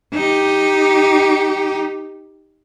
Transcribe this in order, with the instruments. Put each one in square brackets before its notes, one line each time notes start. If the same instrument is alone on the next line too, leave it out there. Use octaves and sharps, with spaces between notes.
[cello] D#4 G4